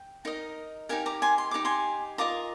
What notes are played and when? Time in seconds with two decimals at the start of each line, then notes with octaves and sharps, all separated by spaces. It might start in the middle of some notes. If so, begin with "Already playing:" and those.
Already playing: G5
0.25 D#4 A#4 D#5
0.89 D#4 G4 A#4 F5 G#5
1.06 A#5 D6
1.22 G#5 C6
1.38 C6
1.51 D#4 G4 A#4 D6
1.65 G#5 C6
2.18 F4 A#4 D#5 A#5 D6